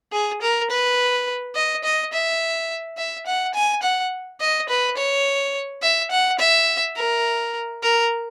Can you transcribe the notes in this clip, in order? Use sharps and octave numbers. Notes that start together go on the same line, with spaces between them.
G#4
A#4
B4
D#5
D#5
E5
E5
F#5
G#5
F#5
D#5
B4
C#5
E5
F#5
E5
A#4
A#4